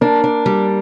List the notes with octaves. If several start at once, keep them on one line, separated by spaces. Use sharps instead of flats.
A#3 D4
D4
G3